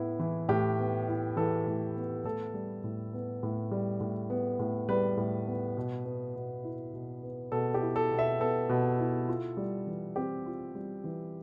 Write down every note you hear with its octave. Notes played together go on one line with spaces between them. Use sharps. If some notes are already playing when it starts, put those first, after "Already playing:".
Already playing: A2 B3 E4
E3
A2 G4
B3
E4
E3 A4
A2
B3
A2 A4
G3
A2
B3
A2
G3
A2
B3
A2
G3 B4
A2
B3
B2
B3
B2
E4
B2
B3
B2 A4
G4
E4
A4
B2
E5
B3 A4
B2
E4
F4
G3
E3
C4 G4
F4
G3
E3